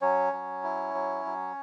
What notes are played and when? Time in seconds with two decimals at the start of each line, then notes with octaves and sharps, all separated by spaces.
0.02 F#3 C#4 C#5
0.33 F#3
0.63 E4
0.94 F#3
1.25 F#3